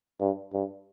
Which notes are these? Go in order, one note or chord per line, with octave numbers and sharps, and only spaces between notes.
G2
G2